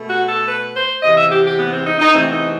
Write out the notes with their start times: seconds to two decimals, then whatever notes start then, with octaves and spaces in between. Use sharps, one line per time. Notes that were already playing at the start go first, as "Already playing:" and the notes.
Already playing: B2 A3
0.10 F#4
0.29 A4
0.48 B4
0.75 C5
1.02 E2 C3 E3 D#5
1.16 E5
1.31 G4
1.45 G4
1.58 B3
1.73 C4
1.86 D#4
1.99 D#4
2.14 E2 C3 E3 A3 C4
2.32 D#4